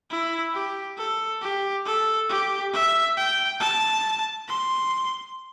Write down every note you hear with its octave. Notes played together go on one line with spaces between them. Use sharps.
E4
G4
A4
G4
A4
G4
E5
G5
A5
C6